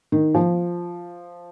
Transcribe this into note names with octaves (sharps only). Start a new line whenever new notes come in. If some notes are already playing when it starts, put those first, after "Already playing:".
D#3
F3